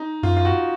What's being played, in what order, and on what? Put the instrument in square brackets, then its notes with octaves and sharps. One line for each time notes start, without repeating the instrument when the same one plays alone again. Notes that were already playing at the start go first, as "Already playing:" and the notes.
Already playing: [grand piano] D#4
[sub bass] F#2 [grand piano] F4
[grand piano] F4
F#4